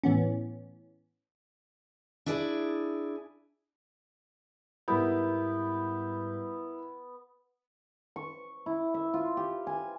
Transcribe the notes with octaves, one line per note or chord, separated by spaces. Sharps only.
A2 E3 B3 C#4
D4 E4 G#4 D5
G#2 G3 B3 E4 A#4 B4 G6
C#6
E4
E5
F4
G4
G#5